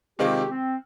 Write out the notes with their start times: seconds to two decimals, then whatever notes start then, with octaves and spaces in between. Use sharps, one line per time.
0.19 C3 D#3 G#3 C4 F4 G4
0.49 C4